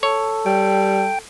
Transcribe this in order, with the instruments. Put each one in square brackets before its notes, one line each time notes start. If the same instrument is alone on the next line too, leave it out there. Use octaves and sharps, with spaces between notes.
[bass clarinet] A4 [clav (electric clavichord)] C#5
[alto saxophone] G3 [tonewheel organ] G5